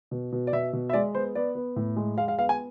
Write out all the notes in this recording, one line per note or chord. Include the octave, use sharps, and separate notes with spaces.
B2
B2
D5
B2 E5
B2
E5
G#3 D5
B3 C5
B3 D5
B3
A2
G#3
G#3 F5
F5
B3 F5
G#5